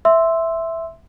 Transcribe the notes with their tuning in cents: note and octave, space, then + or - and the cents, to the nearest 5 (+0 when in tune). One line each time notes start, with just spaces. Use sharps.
E5 +0 C6 +0 E6 +0